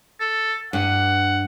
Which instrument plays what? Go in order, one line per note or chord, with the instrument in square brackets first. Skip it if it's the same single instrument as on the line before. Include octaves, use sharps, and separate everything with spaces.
[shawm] A4
[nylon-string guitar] G2 [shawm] F#5